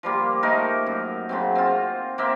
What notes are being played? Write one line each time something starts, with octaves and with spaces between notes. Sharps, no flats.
F3 G3 A#3
A3 A#3 D#4 A#4
F#2
C#3 F#3 C4
C4 F4
A#3 C4 E5